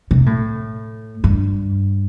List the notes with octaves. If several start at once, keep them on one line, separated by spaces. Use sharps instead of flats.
C3
A2
G2